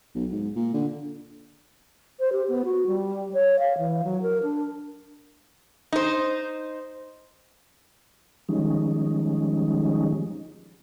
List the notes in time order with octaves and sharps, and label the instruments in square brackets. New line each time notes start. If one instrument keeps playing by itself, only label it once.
[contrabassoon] B1
G#2
A#2
D3
[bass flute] C5
G4
B3
F#4
G3
C#5
F5
E3
F#3
A#4
D4
[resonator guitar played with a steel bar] D#4 C5
[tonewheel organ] D#3 F3 G3 G#3 C#4 D#4